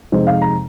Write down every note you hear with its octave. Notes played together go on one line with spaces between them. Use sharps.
F2 C3 G#3 D#4 C5
F5
A#5